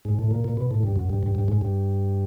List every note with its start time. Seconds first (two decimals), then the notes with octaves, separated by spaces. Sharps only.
0.05 G#2
0.19 A2
0.31 A#2
0.44 A#2
0.57 B2
0.71 A2
0.83 G2
0.96 F#2
1.09 G2
1.23 G2
1.35 G2
1.48 G#2
1.61 G2